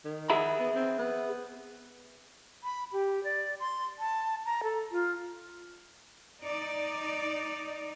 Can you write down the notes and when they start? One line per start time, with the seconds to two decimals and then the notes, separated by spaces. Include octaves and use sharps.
0.05 D#3
0.30 G#4 E5 B5
0.60 B3
0.75 C4
0.99 B3
2.64 B5
2.92 G4
3.24 D5
3.60 C6
3.99 A5
4.45 A#5
4.63 A4
4.91 F4
6.42 D#4 D5